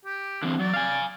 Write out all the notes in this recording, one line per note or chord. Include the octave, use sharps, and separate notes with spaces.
G4
D3 E3 C4
F#3 D5
F5 G#5